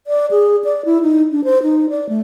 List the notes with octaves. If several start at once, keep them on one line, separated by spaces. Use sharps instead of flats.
D5
G#4
D5
E4
D#4
D4
C5
D#4
D5
A3